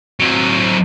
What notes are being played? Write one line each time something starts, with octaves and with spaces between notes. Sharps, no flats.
F#3 C4